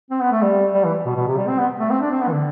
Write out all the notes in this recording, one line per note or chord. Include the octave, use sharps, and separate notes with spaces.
C4
B3
A3
G3
G3
E3
B2
B2
C3
G3
C4
B3
A3
C4
D4
C4
B3
E3
D3